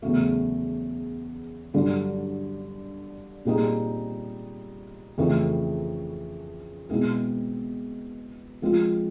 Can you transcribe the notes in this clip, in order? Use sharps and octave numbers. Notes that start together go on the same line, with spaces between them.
E2 C#3 F#3 A3 C#4
G2 D3 F#3
A#2 G3 C4 D#4 G#4
F2 C#3 E3 A3 C4
B2 G#3 C4 E4 G#4
F3 G#3 C4 F4